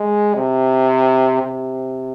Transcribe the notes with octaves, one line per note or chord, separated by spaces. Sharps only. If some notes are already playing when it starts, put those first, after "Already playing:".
Already playing: G#3
C3
C3